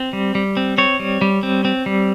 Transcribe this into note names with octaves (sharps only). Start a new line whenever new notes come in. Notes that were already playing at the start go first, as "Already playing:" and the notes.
Already playing: C4
G3
G3
C4
C4 C#5
G3
G3
C4
C4
G3